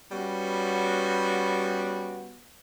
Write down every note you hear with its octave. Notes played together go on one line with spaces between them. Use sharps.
G3 B3 C#4 F#4